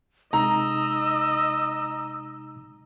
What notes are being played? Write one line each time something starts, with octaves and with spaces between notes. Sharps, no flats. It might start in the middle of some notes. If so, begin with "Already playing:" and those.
C3 G#3 D#4 D#5 A#5 E6